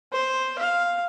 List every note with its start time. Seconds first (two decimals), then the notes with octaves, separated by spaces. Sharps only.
0.12 C5
0.58 F5